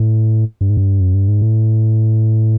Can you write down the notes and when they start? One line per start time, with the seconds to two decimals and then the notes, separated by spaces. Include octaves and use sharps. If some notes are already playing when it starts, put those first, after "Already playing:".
Already playing: A2
0.61 G2
0.70 G#2
0.77 G2
1.01 F#2
1.14 G2
1.28 G#2
1.41 A2